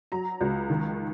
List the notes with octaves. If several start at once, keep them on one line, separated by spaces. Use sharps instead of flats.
F#3 A#5
C#2
D#3